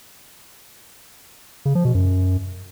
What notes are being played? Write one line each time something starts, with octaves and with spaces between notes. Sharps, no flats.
C#3
F3
B2
F#2